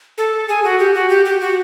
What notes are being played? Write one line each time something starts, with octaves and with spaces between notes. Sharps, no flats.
A4
G#4
F#4
G4
F#4
G4
G4
F#4